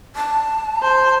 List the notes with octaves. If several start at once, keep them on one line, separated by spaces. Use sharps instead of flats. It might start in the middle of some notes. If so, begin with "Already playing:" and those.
A5
C5